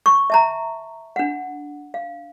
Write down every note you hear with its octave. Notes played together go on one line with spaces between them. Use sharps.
C#6
E5 A5 A#5
D4 F#5
F5